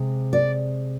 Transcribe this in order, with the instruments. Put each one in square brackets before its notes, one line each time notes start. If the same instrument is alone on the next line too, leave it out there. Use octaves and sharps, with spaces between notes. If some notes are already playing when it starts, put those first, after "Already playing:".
Already playing: [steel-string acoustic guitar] C3 G#3
D5